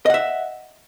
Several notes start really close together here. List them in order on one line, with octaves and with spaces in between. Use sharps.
D#5 F#5 E5